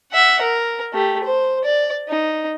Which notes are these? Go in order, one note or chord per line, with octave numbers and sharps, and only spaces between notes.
E5 F#5
A#4
A3 G4
C5
D5
D#4